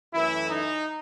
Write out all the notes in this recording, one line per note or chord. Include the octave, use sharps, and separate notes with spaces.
F#2 E3 A3 E4
D#4